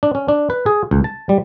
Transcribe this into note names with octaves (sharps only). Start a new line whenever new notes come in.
D4
C#4
D4
B4
G#4
C#2
A5
G3